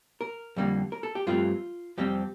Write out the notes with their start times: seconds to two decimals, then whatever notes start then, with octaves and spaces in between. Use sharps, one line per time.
0.21 A#4
0.56 F2 D3 G3 A#3
0.92 A#4
1.03 A4
1.15 G4
1.27 G2 F3 A3 C4 F4
1.98 F2 C3 G3 C4 G4